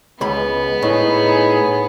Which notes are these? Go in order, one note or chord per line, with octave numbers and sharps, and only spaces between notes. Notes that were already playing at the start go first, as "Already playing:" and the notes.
C#2 G#3 B3 B5
A2 D#4 G#4